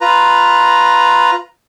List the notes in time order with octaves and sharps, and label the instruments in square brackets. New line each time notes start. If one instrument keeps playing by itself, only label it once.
[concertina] F4 B4 A#5